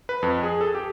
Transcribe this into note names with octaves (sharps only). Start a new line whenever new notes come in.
B4
F2
G#4
A4
G4